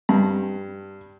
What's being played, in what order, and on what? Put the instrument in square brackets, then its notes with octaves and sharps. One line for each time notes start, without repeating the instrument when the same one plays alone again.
[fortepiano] G2